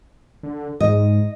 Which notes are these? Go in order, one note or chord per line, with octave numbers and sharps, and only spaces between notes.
D3
G#2 D#5